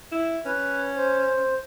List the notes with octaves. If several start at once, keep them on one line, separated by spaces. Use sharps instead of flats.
E4
C#4 B4
C5